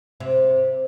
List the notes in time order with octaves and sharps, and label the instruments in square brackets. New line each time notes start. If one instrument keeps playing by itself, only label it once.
[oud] C3